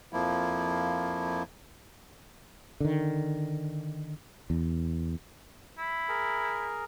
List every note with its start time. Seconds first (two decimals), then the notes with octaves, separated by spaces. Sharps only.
0.13 F2 F3 A#3 E4
2.80 D3 D#3
4.50 E2
5.78 E4
6.09 G#4 A#4